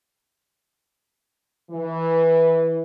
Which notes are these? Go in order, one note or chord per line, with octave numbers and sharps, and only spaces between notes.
E3